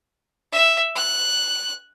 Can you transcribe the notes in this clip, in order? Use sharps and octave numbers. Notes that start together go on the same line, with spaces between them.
E5
F#6